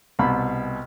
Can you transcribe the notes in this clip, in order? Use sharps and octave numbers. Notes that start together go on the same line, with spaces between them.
C2 B2 B5